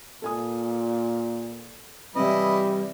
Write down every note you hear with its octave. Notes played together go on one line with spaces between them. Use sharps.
A#2 A4 G#5 D#6
C3 E3 G3 E4 B4 D#5 B5